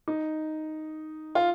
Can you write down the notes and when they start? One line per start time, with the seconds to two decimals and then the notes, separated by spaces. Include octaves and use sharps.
0.08 D#4
1.35 F4